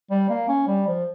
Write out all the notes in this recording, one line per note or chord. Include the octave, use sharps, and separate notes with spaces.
G3
A#3
C#4
G3
F3